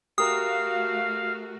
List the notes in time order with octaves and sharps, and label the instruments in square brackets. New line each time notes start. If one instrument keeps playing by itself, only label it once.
[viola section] A3 F#4 [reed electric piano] G4 A#4 A#5 [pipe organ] F5 [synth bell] D#6